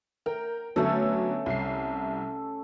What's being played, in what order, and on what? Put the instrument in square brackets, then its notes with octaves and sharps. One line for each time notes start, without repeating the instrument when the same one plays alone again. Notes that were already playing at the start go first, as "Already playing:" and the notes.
[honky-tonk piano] A#4 [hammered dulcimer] G5
[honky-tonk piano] D3 F#3 B3 [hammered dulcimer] A3 C#4 A4
[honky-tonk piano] C2 C7